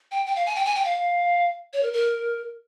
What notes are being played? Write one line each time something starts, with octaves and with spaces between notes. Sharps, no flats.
G5
G5
F5
G#5
G5
G#5
G5
F5
C#5
A#4
A#4